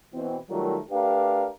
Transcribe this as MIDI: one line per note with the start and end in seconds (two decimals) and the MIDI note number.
0.14 0.37 47
0.14 0.37 52
0.14 0.37 60
0.50 0.77 51
0.50 0.77 54
0.50 0.77 55
0.50 0.77 57
0.50 0.77 65
0.50 0.77 70
0.91 1.48 57
0.91 1.48 62
0.91 1.48 67
0.91 1.48 70
0.91 1.48 71
0.91 1.48 77